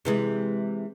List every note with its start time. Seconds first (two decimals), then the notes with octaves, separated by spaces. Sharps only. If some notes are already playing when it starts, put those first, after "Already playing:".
0.05 C3 E3 G#3